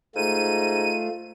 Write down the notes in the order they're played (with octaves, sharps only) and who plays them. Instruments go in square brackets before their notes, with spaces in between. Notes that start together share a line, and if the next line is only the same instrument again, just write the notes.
[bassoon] G#2 [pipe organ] A3 F4 [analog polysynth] D#7